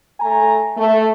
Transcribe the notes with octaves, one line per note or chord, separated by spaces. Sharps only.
A3 G#5 A#5
A3